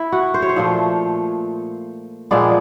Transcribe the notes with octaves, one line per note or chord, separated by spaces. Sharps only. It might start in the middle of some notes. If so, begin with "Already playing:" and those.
Already playing: E4
F#4
C5
C#5
C5
A#2 F3 A3
A#2 F3 G#3 B3 D5